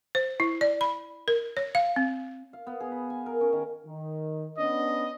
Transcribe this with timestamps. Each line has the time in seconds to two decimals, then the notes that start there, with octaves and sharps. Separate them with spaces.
0.15 C5
0.40 E4
0.61 D5
0.81 B5
1.28 A#4
1.57 C#5
1.75 F5
1.96 C4
2.53 F5
2.67 B3
2.80 G#4
2.92 B5
3.10 G#5
3.26 A#4
3.41 C#4
3.53 D#3
3.86 D#3
4.58 B3 C#4 D4 D#5